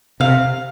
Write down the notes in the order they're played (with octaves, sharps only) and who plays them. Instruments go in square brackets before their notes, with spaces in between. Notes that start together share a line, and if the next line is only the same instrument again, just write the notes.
[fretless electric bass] C3 [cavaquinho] F5